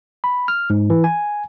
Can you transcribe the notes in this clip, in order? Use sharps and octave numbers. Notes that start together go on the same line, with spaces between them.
B5
F6
G#2
E3
G#5